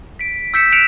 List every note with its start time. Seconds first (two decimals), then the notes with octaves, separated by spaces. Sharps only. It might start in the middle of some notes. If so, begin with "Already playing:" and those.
0.19 B6 D7
0.54 E6 G6 B6 C#7 E7
0.72 F#6 G6 C#7 D7 E7 F7